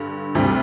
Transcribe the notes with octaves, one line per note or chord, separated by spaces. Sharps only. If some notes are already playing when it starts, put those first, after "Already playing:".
Already playing: G2 D3
D2 C3 G3